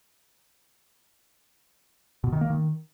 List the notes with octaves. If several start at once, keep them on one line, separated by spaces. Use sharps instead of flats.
B2
D#3
A#3
D#3